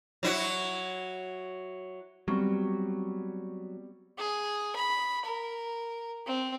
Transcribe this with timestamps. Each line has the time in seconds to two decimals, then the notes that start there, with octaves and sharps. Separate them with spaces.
0.23 F#3 E4 F#4
2.28 F#3 G3 B3 C4 G4 C#6
4.18 G#4
4.76 B5
5.25 A#4
6.26 C4